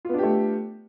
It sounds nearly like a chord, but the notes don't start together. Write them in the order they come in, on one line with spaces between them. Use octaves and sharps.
F4 B3 D4 G4 A3